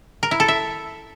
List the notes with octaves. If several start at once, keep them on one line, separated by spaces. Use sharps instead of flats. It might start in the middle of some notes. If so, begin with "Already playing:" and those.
A#4
E4
A4
E5